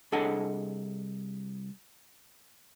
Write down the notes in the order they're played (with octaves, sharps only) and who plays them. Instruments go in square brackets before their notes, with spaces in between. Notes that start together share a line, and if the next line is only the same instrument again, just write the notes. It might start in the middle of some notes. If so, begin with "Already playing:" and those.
[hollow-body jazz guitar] C2 D4 G#4 A4 D#5 F#5